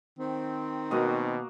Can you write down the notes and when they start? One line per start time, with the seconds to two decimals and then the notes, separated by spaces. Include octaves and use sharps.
0.19 D#3 C4
0.91 B2 A#3 F#4 D#5